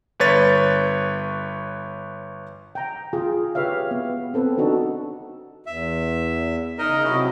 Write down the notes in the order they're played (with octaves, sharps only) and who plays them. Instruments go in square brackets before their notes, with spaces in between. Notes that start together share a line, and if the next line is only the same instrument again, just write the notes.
[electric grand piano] G1 B4 C#5 A6
[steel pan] G5 A#5
F4 G#4
G4 B4 C#5 E5 F5
B3
C4 A4 B4
D4 D#4 F#4 A4
[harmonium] E2 [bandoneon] E5
[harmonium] C#3 [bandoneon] D#4 A#4 D#5
[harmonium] C3 F#3 [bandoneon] C#4 E4